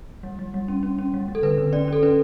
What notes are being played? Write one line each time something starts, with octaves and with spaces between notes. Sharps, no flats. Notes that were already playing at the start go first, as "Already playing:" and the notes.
G3
G3
G3
C#4
C#4
C#4
G3
G3
A4
D3 B4
D3
C#4 D5
C#4 A4
C#4 B4